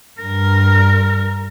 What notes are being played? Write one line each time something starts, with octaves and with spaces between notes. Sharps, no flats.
G2 A#4